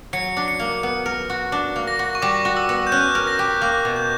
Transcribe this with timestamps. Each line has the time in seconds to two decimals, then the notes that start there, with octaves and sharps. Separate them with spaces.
0.13 F#3 C#7
0.37 D4
0.48 C#7
0.60 A#3
0.83 B3
1.06 A#4
1.30 F#4
1.52 D4
1.76 A#3
1.88 A#6
1.99 F#4
2.15 C#6
2.22 G3 D6
2.45 F#4
2.57 E6
2.69 B3
2.87 G6
2.92 C#4 F#6
3.15 A#4
3.27 A#6
3.39 G4
3.62 A#3 F#6
3.85 B2
3.96 G6